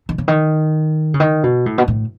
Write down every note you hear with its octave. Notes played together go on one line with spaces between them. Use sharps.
D#3
C#3
D#3
C#3
D#3
B2
A2
B2
A2